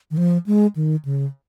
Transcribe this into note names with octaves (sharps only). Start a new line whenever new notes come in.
D#3
F3
G#3
D#3
C#3